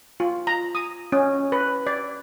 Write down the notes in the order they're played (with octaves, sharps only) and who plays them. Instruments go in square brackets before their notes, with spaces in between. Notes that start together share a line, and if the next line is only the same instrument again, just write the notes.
[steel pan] F4
A#5
D#6
C#4
B4
D5